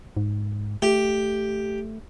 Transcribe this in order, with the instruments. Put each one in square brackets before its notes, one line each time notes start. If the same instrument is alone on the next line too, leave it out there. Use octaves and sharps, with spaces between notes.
[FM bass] G#2
[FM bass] A3 [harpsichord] G4